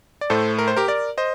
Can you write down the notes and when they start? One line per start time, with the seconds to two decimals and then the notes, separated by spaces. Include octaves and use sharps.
0.21 D5
0.30 A2 A3 A4 C5
0.59 A#4
0.68 C5
0.76 G4 A#4
0.88 A#4 D5
1.18 C5 D#5